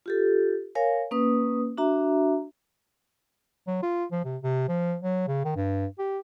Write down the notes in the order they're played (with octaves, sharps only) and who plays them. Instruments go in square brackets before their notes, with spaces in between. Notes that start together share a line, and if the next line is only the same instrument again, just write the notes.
[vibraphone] F4 G4 A4
A#4 C#5 F5 G#5
A#3 C#4 B4 D#6
D4 F#4 E5 A#5
[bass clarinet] F#3
F4
F3
C3
C3
F3
F#3
C#3
D#3
G2
G4